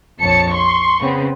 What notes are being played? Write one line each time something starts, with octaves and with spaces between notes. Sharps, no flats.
A#1 F2 C#5 A5 C#7
C6 C#6
C#3 B3 C4